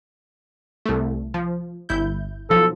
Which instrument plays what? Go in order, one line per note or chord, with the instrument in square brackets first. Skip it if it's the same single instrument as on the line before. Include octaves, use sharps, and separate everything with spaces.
[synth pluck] C2 A3
F3
G1 E4 G6
[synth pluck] B1 F3 [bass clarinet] A4